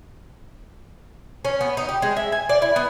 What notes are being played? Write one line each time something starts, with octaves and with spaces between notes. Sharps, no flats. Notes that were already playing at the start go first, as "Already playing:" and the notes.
C#4
B3
D#4
G4
G#3
E5
G#5
D5
E4
B3